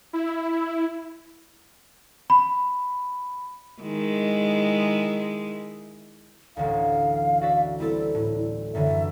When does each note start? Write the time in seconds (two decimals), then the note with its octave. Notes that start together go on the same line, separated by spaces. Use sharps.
0.13 E4
2.30 B5
3.82 D#3 G#3 E4
6.57 A1 D2 F5
7.41 F#4 D5 E5
7.80 G3 C4 E4 A4
8.15 A2
8.75 F#2 D3 E3 E5